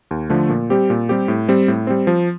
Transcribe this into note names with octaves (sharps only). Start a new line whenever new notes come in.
D#2
D3 F3 A3
A#2
G3 C4 G4
A#2
G3 C4 G4
A2
G3 C4
A2
G3 C4
F3